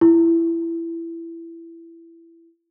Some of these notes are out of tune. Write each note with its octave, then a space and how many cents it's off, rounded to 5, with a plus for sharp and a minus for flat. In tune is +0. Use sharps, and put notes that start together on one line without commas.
E4 +15